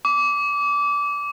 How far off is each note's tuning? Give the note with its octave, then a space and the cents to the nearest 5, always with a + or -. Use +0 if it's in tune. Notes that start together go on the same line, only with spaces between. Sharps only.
D6 -20